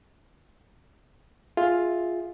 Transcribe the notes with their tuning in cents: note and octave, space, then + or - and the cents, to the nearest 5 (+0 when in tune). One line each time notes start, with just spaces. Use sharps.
F4 +5 G#4 +0 E5 +0